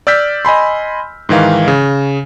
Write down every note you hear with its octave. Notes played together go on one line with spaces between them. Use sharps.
D5 E6 F6 G6 B6
D#5 G#5 B5 C6
G#2 D#3 E3 F5
C#3